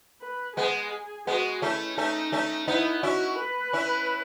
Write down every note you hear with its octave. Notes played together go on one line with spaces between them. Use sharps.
B4
G#3 B3 G#4
G#3 B3 F#4
A3 C#4 E4
A3 C#4 D#4
A3 C#4
B3 D#4 E4
C#4 E4 F#4
B4
C#4 E4